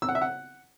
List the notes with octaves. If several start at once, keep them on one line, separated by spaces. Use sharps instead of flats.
E6
F#5
E5
F#5